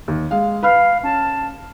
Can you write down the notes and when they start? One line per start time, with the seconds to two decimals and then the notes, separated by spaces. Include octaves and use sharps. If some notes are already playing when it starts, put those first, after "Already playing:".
0.08 D#2
0.31 G#3 F5
0.63 B4 F5 B5 F6
1.03 C#4 A5